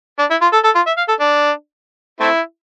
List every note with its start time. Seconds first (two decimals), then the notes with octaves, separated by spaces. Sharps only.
0.19 D4
0.31 E4
0.42 F4
0.53 A4
0.64 A4
0.75 F4
0.87 E5
0.97 F5
1.09 A4
1.20 D4
2.20 A3 C4 E4